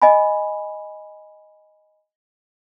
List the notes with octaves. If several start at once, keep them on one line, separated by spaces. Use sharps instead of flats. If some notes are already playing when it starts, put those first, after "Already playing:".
D#5 G#5 B5